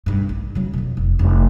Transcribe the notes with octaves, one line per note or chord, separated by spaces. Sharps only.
B1 G2
A#1
C#3 F#3
F2 B2
F1
F1